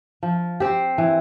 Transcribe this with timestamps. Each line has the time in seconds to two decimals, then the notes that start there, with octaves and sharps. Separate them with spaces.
0.23 F3
0.60 C4 G4
0.98 E3